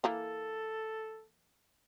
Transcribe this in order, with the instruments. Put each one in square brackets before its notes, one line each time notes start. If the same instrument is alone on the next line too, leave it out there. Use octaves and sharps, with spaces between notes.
[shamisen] E3 A#3 A#5 [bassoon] A4